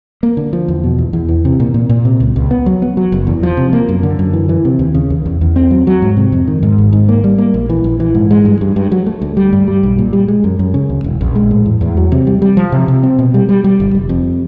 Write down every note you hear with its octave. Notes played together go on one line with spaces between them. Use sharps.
A#3
D3
F3
E2
B2
E2
E2
E3
C3
A#2
A#2
A#2
C3
C#2
C#2
B3
F#3
B3
F#3
F#1
E2
F3
C3
A#3
F#2
D3
F#2
E3
E3
C3
D#2
C#3
D#2
E2
E2
C4
F#3
F#3
G#2
C3
F2
D#3
G#2
G#1
G#2
A#3
G3
A#3
A#1
E3
A#1
E3
G#2
G#3
G2
G2
G2
F#3
A3
D2
G3
G2
G3
B1
A#2
G3
G#3
F#2
F#2
C#3
D2
E1
A#1
G#3
A2
E2
E2
F#3
C3
G3
G3
F3
C3
C3
C4
B2
G3
G3
G3
G1
F1
F2